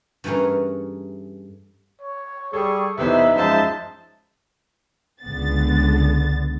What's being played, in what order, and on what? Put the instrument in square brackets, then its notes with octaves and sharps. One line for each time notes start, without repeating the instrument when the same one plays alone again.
[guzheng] G2 E3 A3 C#4 G#4 A#4
[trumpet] C#5
[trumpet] G3 [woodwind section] G#4 C#6 [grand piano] A4
[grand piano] E2 C3 [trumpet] D#4 [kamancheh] B4 C5 [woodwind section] E5
[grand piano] F#2 F3 G#3 [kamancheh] C5 A5
[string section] C#2 D3 B3 A6